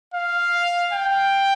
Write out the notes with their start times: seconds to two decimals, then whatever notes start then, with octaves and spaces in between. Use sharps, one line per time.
0.14 F5
0.93 G5